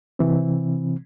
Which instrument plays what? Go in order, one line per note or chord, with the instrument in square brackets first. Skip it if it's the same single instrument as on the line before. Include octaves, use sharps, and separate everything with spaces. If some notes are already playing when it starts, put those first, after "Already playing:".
[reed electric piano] C3 E3 C4